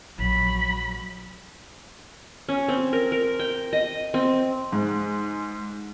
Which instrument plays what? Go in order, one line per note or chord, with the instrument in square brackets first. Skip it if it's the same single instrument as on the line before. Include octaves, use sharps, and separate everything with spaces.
[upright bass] A#1 [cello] F#3 [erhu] B5
[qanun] C#4
C4
A#4
A#4
G5
D#5
C4
[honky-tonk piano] G#2